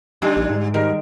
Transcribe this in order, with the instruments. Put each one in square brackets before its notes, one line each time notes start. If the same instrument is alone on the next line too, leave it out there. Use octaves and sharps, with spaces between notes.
[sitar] D3 G3 [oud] D4 D#4 G4
[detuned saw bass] A#1
G#2
[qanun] D#3 G#3 [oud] G3 [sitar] A#4